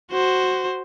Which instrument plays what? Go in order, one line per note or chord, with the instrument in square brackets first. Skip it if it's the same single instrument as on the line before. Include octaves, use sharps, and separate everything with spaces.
[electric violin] F#4 C5